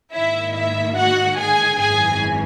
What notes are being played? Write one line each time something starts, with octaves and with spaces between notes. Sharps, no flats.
G#2 D#3 A#3 E4 E5
E4 E5
F#4 F#5
G#4 G#5
G#1 F#2 E3 G#4 G#5